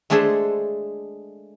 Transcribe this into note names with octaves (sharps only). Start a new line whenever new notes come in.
G#3 A3 D4 G#4 A4 C5